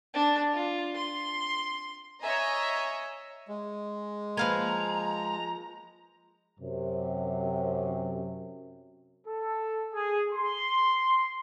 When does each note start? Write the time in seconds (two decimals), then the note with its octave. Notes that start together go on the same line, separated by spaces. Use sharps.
0.14 D4
0.53 F4
0.96 C6
2.21 C#5 D#5 E5 G#5 A#5
3.48 G#3
4.37 F3 A#3 B4 F5 G#5 A#5
6.60 F#2 C3
9.26 A4
9.93 G#4
10.33 C6